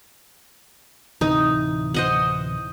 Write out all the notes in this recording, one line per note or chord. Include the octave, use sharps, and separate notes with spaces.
D1 C3 E3 D#4
C5 D#5 F#5